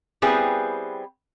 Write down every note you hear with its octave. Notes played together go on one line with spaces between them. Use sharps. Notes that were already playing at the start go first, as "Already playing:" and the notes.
G3 B3 C4 E4 G#4 B4